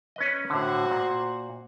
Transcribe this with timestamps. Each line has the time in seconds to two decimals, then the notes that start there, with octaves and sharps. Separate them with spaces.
0.16 C#4 B4 D#5
0.50 A2 D3 F#4 C5
0.91 A#2